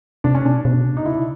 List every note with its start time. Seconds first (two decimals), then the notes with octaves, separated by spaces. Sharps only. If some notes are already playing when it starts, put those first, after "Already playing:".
0.24 C3 D4
0.35 C#4
0.45 B2 D4
0.65 B2
0.85 C3
0.97 D#4
1.05 C#3 E4